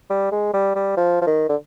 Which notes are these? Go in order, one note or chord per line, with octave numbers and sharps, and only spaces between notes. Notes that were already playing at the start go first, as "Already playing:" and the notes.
G3
G#3
G3
G3
F3
F3
D#3
D3